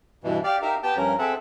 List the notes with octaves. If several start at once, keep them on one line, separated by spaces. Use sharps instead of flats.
G2 B2 E3
G4 D5 F5
D#4 G4 A#4 E5 F5
B3 G4 G5 A5
G2 F3 C#4 A#4
C4 G#4 A4 E5 F#5